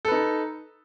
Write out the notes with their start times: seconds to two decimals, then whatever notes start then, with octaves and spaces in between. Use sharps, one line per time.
0.05 A4
0.08 B4
0.12 D#4